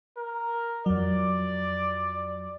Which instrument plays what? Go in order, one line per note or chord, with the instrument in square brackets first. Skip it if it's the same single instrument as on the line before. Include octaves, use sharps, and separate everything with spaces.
[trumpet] A#4
[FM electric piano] F2 F#3 [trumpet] D5